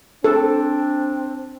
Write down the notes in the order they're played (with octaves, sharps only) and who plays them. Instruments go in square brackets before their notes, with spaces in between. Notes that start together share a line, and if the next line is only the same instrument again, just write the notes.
[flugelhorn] C4 [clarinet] D4 [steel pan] A4